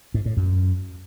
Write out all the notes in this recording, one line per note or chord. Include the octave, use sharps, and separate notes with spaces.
G#2
A2
F#2